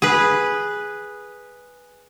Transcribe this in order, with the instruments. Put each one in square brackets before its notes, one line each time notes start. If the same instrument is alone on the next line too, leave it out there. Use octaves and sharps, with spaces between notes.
[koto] G#4 B4